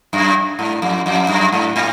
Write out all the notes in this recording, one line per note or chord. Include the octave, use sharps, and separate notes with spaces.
F#2
G#2
F2
F2
F#2
G#2
A2